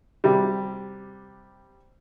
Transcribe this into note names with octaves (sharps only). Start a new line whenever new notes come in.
C3 G3